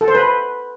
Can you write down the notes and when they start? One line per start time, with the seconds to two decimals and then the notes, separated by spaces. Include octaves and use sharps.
0.01 A4
0.08 C5
0.15 B4